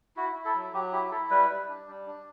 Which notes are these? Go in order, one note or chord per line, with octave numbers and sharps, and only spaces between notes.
E4 F#4
E4
A4
F#3
F#3 G4
E4 G4
E4 A4
G3 B4
G3
D4
G3
D4